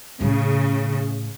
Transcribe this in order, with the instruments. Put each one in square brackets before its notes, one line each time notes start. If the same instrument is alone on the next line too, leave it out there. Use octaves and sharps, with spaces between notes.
[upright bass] A2 A3 [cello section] C#3